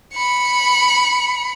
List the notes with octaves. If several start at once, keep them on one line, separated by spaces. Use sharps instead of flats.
B5 C#7